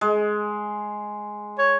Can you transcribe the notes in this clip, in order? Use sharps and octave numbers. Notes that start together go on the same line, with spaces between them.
G#3
C#5